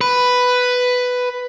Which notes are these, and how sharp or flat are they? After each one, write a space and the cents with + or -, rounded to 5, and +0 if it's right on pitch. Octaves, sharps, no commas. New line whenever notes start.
B4 +5